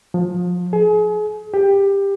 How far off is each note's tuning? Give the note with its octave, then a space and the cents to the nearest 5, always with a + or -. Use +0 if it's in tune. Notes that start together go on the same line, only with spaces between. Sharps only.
F3 +30
G#4 +35
G4 +15